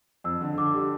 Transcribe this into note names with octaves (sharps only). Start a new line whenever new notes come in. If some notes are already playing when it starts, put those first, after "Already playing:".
F2 E6
D3
D3 D6
G3